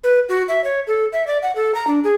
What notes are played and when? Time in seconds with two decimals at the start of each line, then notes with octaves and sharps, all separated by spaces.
0.04 B4
0.29 F#4
0.48 E5
0.64 C#5
0.87 A4
1.13 E5
1.27 D5
1.43 F#5
1.56 A4
1.75 A#5
1.87 D4
2.04 G#4